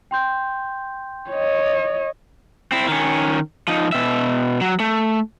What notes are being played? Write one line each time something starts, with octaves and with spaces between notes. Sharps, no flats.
G5 C6 G6
C#5 D#5
C4 E4
D#3 C#4
F3 D#4
B2 E5
F#3
A3